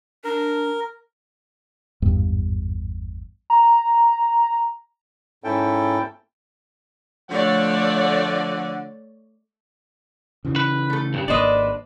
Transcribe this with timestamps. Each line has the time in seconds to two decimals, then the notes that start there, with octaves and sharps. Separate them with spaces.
0.24 D4 A#4
2.02 G#1 E2 G2
3.50 A#5
5.44 G#2 C#4 E4 A4 G5
7.30 D3 F3 A3 C#5 D5 F#5
10.45 C#3 E3
10.56 B4
10.90 A3 A4
11.14 G2 A#2 C#3
11.28 G#1 A#3 D4 B4 C5 D5 D#5